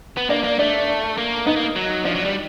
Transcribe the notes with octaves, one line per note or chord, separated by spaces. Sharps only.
B3
A#3 D4 D5
A#3
A3 D4 D5
A#3
B3 D#4 D#5
A#3
F#3
F3 D4 D5
F#3
G3